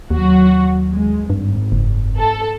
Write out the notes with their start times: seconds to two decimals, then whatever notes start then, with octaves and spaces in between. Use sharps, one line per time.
0.11 D#2 F#3 F#4
0.92 G#3
1.30 G#1 G2
1.72 F#1
2.17 A4